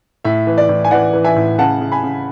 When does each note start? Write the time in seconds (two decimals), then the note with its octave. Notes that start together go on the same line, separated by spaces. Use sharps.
0.24 A2 E5
0.47 E3
0.58 D5
0.69 A2
0.85 G#5
0.91 E3 D5 F#5
1.13 E3
1.24 E5 G#5
1.36 A2
1.58 C#3 F#5 A5
1.81 C#3
1.92 G#5 B5
2.03 C#3